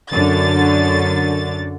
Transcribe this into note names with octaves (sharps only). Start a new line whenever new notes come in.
F#2 D3 A6